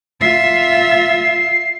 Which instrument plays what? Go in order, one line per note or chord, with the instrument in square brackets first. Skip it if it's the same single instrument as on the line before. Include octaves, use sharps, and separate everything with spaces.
[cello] F4 E5 [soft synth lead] C7